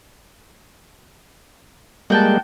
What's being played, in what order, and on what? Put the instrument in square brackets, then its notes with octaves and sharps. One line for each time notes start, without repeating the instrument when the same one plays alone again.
[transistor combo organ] G3 G#3 A#3 [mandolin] F#4 G5 A5